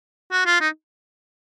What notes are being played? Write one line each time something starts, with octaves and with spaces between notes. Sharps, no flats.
F#4
F4
D#4